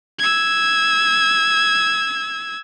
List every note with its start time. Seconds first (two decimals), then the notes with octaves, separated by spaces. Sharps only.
0.19 E6 G#6